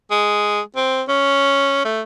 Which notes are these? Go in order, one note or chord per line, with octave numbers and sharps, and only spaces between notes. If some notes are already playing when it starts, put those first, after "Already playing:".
G#3
C4
C#4
A3